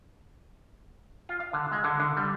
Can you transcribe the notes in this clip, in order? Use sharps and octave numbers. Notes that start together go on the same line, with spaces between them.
F4
F5
D3
G#3
D3
D3
G3